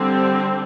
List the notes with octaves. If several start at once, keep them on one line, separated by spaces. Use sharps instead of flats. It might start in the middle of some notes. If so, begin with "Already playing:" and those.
Already playing: D3 G3 C4